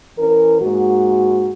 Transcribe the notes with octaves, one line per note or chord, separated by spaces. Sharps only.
E3 C#4 A#4
G#2 A#3 F#4